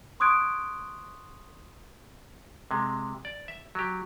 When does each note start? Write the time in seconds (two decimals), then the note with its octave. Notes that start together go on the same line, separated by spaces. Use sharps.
0.20 C6 C#6 D#6 F#6 G#6 D7
2.71 C3 G#3
3.25 D5
3.48 E5
3.75 F#3 G4